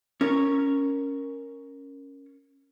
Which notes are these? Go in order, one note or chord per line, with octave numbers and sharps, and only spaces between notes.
C#4 A#4 C#5